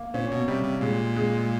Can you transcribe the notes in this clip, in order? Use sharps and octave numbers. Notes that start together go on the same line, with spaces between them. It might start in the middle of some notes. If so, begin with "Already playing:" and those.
Already playing: A#3
A#2 C#4
B2
C3 G3
C3
A#2 G#3
G#3